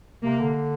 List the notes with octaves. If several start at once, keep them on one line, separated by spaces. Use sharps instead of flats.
C3 A#3
D3